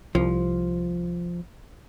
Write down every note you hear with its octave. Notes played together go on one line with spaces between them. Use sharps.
C2 F3